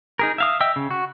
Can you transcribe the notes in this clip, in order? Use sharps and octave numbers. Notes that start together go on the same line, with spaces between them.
D#4 G#4 A#4
E5 F5 D#6
D#5 E5 G5 E6
C#3
F#4